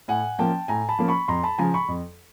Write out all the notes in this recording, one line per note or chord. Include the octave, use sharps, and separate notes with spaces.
A2 F#5 G#5
F3 A#3 C#4 G5 A5
A2 G#5 A#5
A5 B5
F3 A#3 C#4
B5 C#6
F2 A#5 C6
A5 B5
C#3 F3 G#5 A#5
B5 C#6
F2